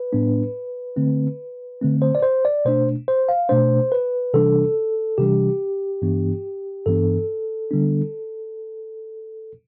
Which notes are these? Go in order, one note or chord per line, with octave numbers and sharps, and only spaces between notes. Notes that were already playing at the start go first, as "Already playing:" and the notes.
Already playing: B4
A2 G3 B3 D4
D3 A3 C4
D3 A3 C4
C5
D5
C5
D5
B2 A3 D4 C5
C5
F5
B2 A3 D4 C5
B4
C3 E3 G3 D4 A4
C3 E3 G3 D4 G4
G2 E3 B3 D4
G2 E3 B3 D4 A4
D3 G3 B3 D4